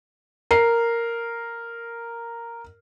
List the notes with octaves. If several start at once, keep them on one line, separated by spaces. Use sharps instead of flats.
A#4 C7